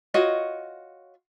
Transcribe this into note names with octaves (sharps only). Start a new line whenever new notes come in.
F4 F#4 C#5 D#5